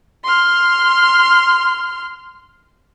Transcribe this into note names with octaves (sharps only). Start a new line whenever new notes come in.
C6 F6